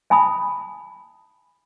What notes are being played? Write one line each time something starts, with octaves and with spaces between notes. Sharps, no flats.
E5 G#5 A5 B5 D#6